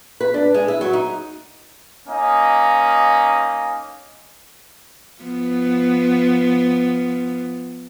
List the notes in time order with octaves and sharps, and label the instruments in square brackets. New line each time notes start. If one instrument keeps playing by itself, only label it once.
[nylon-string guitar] B4
D4
G#3
E4
F#3
D#4
[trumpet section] A#3 C#4 D#4
[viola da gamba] F3 B3